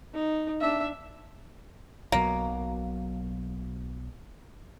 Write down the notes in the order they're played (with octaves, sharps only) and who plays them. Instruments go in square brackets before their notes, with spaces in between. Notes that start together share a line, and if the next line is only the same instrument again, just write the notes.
[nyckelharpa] D#4
D4 E5
[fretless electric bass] B1 B2 F#3 [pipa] A#3